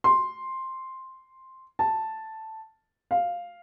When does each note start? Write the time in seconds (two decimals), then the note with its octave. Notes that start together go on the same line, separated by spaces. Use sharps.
0.04 C6
1.79 A5
3.11 F5